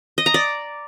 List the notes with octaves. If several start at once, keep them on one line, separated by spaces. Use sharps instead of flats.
D#5
A#5
D5